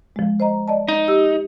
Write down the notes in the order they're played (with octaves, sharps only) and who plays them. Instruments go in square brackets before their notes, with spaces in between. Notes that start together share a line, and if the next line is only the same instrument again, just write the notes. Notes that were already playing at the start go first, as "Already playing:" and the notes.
[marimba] F3 G#3
C5 D#5 A#5
D5 D#5 A5
[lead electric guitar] D#4
[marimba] G4 E6